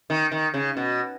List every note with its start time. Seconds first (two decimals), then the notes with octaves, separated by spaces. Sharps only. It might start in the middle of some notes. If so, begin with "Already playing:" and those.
0.10 D#3
0.32 D#3
0.54 C#3
0.77 B2